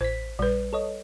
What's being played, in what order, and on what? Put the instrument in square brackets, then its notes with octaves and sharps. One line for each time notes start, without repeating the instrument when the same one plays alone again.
[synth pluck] A1 B6 [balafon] C5
[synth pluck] A#1 [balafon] G3 B4
[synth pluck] A4 C#5 D#5